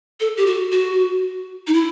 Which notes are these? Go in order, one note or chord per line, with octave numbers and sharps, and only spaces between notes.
A4
G4
F#4
F#4
D#4
E4